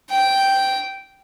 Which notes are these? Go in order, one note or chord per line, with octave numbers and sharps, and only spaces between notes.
G5